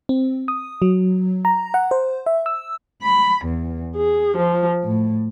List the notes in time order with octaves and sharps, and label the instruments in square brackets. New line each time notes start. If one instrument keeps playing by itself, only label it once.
[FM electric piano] C4
D#6
F#3
A#5
F#5
C5
E5
E6
[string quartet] B5
E2
G#4
F3
A2